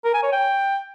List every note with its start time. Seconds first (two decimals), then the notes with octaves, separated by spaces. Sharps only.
0.05 A#4
0.14 G#5
0.23 C#5
0.32 G5